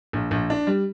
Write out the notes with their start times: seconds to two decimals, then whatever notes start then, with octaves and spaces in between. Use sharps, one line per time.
0.13 A#1
0.31 A#1
0.50 D4
0.67 G3